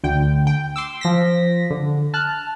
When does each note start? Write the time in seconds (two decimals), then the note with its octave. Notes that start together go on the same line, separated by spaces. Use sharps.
0.04 D2 G5
0.47 G5
0.76 C6 D6 E6
1.01 F3 A#6 B6
1.70 D3
2.14 A5 F6 F#6